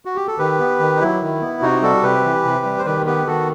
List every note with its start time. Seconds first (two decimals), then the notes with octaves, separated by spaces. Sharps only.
0.05 F#4
0.16 G4
0.28 A4
0.39 D#3 G4 B4
0.59 B3
0.80 D#3
0.96 D#4
1.01 F#3 E4
1.21 D#3
1.41 B3
1.62 C3 D#4 F#4
1.82 G3 F#4 A4
2.03 C3 G4 B4
2.24 E3
2.45 C3
2.65 G3
2.79 C5
2.85 D#3 G4 B4
3.06 B3 G4 B4
3.26 D#3 F#4 A4